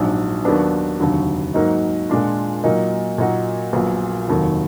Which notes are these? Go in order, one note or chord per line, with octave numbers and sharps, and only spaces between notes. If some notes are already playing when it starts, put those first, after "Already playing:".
Already playing: A#1 G#2 F#3 D4
D#2 D#3 F#3 B3 D4
F1 D#2 D3 F#3
G#2 F#3 A#3 D#4
A#2 G#3 D4 F4
A#2 F#3 A#3 D#4
A#2 F#3 A#3 D#4 F#4
A#1 A#2 F#3 B3
F1 D#2 D#3 F#3